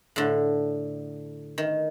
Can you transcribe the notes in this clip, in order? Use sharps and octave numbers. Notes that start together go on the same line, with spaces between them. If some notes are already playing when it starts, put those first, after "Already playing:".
A2 D3
D#3